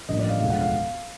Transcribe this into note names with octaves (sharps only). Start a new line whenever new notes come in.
A1 G2 D3 F3 A#3 D#5
D5
F5
E1 D2 D3 F3 G#3 F5
F#5
F5